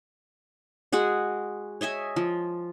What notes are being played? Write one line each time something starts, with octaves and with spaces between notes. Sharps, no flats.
G#3 F#4 G#4 F#5
C#5 D#5 E5 G#5
F3